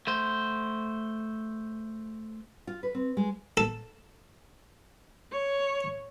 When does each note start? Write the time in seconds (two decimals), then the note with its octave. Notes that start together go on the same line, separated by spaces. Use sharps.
0.07 A3 C5
2.67 F4
2.83 B4
2.95 C4
3.17 G#3
3.57 A4
5.32 C#5